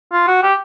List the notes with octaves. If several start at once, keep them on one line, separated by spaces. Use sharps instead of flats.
F4
F#4
G4